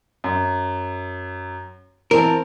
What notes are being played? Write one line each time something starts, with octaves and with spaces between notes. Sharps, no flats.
F#2
E3 C4 A#4 A5